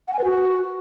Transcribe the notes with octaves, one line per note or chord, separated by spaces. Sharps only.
F#5
G#5
B4
F#4